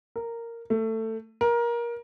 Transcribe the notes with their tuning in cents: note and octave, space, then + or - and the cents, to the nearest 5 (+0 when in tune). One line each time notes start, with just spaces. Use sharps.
A#4 -10
A3 +20
A#4 +20